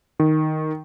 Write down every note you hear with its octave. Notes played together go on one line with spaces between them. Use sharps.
D#3